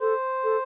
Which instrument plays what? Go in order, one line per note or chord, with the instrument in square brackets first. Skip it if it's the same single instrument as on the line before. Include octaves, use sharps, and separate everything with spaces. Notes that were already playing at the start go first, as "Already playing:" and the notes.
[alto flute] A4 [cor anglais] C5
[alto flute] A4